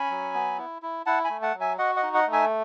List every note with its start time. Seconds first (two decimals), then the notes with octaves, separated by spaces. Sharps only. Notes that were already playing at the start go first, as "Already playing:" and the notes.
Already playing: C#4 G#5 B5
0.10 F#3
0.34 B3
0.58 E4
0.82 E4
1.06 E4 F#5 A5
1.24 G#5 B5
1.30 A3
1.42 F#5 A5
1.54 F#3
1.60 E5 G#5
1.78 F#4 D#5 F#5
1.96 D#5 F#5
2.03 D#4
2.14 D#5 F#5
2.27 A3
2.32 E5 G#5